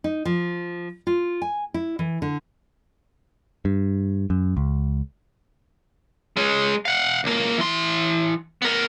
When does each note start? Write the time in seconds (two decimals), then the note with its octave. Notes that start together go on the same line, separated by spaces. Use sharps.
0.04 D#4
0.25 F3
1.07 F4
1.42 G#5
1.74 E4
1.99 E3
2.22 D3
3.65 G2
4.30 F#2
4.57 C#2
6.37 G#3 C#4
6.85 F5 F#5
7.24 C#2 A#3
7.58 E3 C6
8.62 B3 A#4